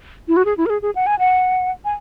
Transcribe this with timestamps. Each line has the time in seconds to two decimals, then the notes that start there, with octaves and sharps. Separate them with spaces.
0.28 E4
0.36 F#4
0.45 G#4
0.57 E4
0.66 A#4
0.70 G#4
0.82 G#4
0.95 F#5
1.06 G#5
1.19 F#5
1.85 G#5